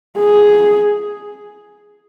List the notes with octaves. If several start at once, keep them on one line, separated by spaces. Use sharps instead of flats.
G#4